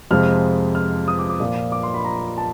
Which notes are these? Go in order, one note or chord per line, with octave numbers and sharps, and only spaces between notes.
F2 C3 F3 G#3 F6
F6
D#6
D6
D6
A#2 F3 A#3
D6
C6
B5
A#5
A5